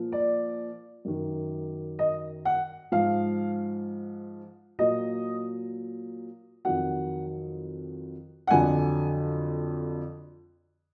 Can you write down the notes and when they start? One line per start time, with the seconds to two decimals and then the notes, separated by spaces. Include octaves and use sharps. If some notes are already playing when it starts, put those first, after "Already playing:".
Already playing: A#2 F3
0.12 D5
1.05 F#2 D#3 F#3
1.99 D#5
2.45 F#5
2.92 G#2 F3 F5
4.79 A#2 F#3 D#5
6.65 F2 D#3 F#3 F#5
8.47 F#5
8.51 F2 D3 F#3 G#5